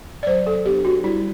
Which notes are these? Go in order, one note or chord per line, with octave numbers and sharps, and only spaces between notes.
D5
F#3 C5
A4
B3 D4 G4
F#4
G3 E4